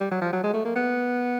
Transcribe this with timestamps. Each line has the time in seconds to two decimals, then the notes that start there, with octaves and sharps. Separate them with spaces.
0.01 G3
0.11 F#3
0.21 F3
0.33 F#3
0.44 G#3
0.54 A3
0.65 A#3
0.76 B3